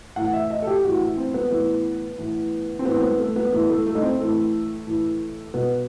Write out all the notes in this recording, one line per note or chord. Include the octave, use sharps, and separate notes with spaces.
A2 E3 F#5
E5
D#5
A4
G4
A2 E3 F#4
E4
C4
B3
A2 E3 B3
A2 E3
C4
A2 E3 B3
C4
B3
A3
B3
A2 E3 B3
A3
A3
D#4
C4
A2 E3 A3
A2 E3
B2 B3